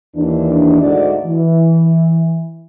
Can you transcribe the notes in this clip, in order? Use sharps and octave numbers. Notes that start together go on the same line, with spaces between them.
D#2 E3 D4
D2 G#2 A3 D#4 F#4 D5
E3